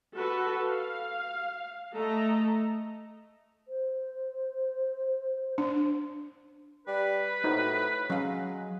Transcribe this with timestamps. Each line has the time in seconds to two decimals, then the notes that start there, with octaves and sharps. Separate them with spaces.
0.16 F#4 A4 B4
0.66 F5
1.93 A3 A4 D#5 A#5
3.68 C5
5.58 D4
6.87 G3 B4
7.44 A2 D#4 F#4 C5
8.10 F#3 G#3 C#4 F5